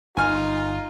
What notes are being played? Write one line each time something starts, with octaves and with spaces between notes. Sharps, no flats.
G1 D#4 F4 G#5 F6